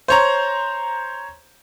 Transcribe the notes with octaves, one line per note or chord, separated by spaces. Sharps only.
C5 C#5 A#5